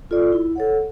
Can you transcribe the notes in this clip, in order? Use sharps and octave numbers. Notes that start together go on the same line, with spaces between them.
F4 A4 D5
E4
A4 C#5 F#5